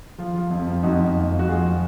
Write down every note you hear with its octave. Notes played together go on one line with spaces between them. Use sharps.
F3 F4
F3
F2
F3
F2 D#4 F#4
F3
F2
F3
F#4
F3 F4 G#4